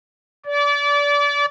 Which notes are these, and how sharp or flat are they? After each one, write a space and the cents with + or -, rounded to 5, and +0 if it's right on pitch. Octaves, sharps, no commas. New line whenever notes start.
D5 -30